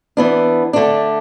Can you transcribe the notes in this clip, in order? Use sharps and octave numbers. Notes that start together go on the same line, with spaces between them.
E3 B3 D4
D3 A3 D4